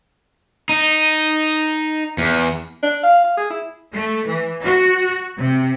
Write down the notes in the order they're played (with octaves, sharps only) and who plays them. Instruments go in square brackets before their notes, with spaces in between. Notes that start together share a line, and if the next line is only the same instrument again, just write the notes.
[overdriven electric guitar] D#4
E2
[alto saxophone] D4
F5
F5
G#4
E4
[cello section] A3
E3
F#4
C3